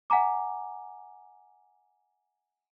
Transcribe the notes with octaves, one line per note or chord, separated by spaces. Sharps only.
E5 F#5 G#5 A#5 D6